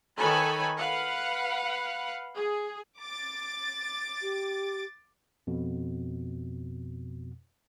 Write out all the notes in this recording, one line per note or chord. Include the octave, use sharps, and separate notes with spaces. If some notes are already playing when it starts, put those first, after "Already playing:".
D#3 A4 B4 C#5 G#5 B5
B4 F5 F#5
G#4
D6 A6
G4
F2 B2